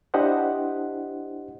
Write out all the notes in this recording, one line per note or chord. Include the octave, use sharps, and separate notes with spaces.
D4 E4 G4 C5 D#5 F#5